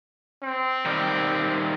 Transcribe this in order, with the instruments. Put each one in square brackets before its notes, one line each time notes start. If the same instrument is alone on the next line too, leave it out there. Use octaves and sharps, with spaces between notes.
[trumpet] C4
[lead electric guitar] D#3 G3